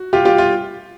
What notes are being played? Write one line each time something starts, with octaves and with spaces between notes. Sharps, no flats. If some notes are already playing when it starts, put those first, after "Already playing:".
Already playing: F#4
F4 G4
F4 G4
F4